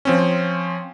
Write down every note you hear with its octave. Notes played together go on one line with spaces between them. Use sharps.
F3 C4 C#4